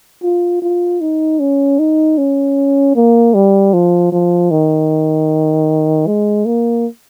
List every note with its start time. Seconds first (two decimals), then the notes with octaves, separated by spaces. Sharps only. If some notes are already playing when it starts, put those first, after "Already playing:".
0.23 F4
0.62 F4
1.01 D#4
1.40 C#4
1.79 D#4
2.18 C#4
2.96 A#3
3.34 G3
3.74 F3
4.12 F3
4.51 D#3
6.07 G#3
6.45 A#3